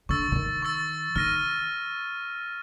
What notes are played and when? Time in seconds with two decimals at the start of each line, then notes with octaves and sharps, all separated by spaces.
0.09 D3 C#6 E6 A6
0.32 D3
0.36 D#3
0.62 C#6 E6 A6
1.16 D#3 F6 A#6 D#7